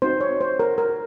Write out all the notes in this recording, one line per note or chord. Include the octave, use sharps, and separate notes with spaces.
C4 D#4 F#4 C5
C#5
C5
A#4
A#4